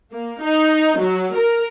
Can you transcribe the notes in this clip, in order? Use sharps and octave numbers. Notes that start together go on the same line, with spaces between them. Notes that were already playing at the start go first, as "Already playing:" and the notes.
A#3
D#4
F#3
A#4